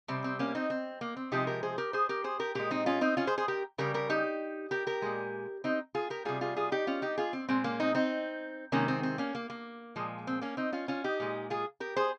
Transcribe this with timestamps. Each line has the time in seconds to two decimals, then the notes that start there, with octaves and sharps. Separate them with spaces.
0.08 C3 G3 C4
0.24 C4
0.39 A#3 C#4
0.55 C4 D#4
0.70 C4
1.01 A#3
1.17 C4
1.32 C3 F3 G#3 D#4 G4
1.47 G4 A#4
1.63 G#4 C5
1.78 G4 A#4
1.93 G#4 C5
2.09 G4 A#4
2.24 G#4 C5
2.39 G4 A#4
2.55 A#2 G#3 G4 A#4
2.71 C4 D#4
2.86 C#4 F4
3.01 C4 D#4
3.17 C#4 F4
3.27 G#4 C5
3.38 G#4 C5
3.48 G4 A#4
3.78 C#3 G3 G4 A#4
3.94 G4 A#4
4.09 D#4 G4
4.71 G4 A#4
4.87 G4 A#4
5.02 A#2 G#3
5.64 C4 D#4
5.95 F4 G#4
6.10 G4 A#4
6.25 C3 G3 F4 G#4
6.41 F4 G#4
6.56 F4 G#4
6.72 D#4 G4
6.87 C#4 F4
7.02 D#4 G4
7.18 F4 G#4
7.33 C4
7.49 A#2 G#3 C4
7.64 A#3 C#4
7.80 C4 D#4
7.95 C4 D#4
8.72 C3 D#3 G#3 A#3 C#4
8.88 C4
9.03 C4
9.18 A#3 C#4
9.35 A#3
9.50 A#3
9.96 A#2 F3 G#3
10.27 C4
10.41 A#3 C#4
10.57 C4 D#4
10.73 C#4 F4
10.88 C#4 F4
11.04 D#4 G4
11.20 A#2 G#3
11.50 F4 G#4
11.80 G4 A#4
11.96 G#4 C5